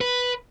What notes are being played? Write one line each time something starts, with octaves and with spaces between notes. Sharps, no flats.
B4